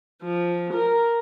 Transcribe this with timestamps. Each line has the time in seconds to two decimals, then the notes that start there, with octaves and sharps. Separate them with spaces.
0.23 F3
0.74 A#4